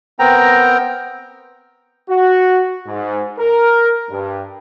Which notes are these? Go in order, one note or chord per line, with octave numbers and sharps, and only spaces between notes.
B3 C4 A#4 G5 A#5
F#4
G#2
A#4
G2